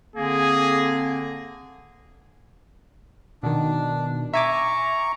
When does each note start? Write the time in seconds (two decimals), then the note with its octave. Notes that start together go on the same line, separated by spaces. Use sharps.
0.16 D3 A#3 C4 G#4
3.43 B2 D#3 D4
4.34 E5 G#5 A#5 C#6 D6